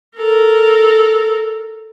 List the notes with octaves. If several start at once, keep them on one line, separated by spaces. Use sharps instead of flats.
A4 A#4